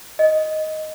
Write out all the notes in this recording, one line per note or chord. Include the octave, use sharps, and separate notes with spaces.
D#5